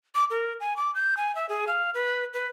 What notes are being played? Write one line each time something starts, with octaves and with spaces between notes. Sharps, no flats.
D6
A#4
G#5
D6
G6
G#5
E5
G#4
F5
B4
B4